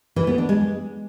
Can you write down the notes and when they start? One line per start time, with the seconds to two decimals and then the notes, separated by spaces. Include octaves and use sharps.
0.16 E3
0.27 B3
0.38 D4
0.49 G#3